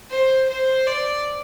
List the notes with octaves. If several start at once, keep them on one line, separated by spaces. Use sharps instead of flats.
C5
C5
D5